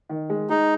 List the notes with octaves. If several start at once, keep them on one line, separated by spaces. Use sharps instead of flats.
D#3
G#3
G#3 D#4